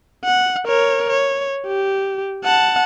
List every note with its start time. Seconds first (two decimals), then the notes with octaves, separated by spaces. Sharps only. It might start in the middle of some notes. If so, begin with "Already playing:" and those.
0.25 F#5
0.67 A#4 C#5
1.10 C#5
1.67 G4
2.44 F#5 A5